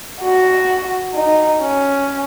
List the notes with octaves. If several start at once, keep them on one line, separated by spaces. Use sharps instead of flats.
F#4
D#4
C#4